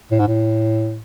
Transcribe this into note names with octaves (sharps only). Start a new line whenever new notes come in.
A2
G#2
A2